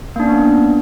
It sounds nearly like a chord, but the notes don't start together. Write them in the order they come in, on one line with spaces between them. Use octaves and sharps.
A#3 D4 C#4 B3